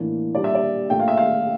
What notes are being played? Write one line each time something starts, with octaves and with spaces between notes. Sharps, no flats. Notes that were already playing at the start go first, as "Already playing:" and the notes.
Already playing: A2 E3 A#3 D4
A#2 G3 D4 D5
E5
D5
A#2 A3 D4 G5
F5
E5
F5